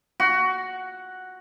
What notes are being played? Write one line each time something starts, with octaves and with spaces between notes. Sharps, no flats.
F#4